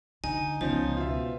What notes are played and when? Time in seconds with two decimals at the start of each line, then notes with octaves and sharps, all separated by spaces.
0.24 D3 D#4 G#5
0.61 C#2 F3 B3 C#4 D#4 F4 C5
0.97 B2 F4 E5